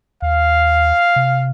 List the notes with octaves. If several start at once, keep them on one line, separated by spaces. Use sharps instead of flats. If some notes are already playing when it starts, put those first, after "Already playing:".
D#2 F5
C3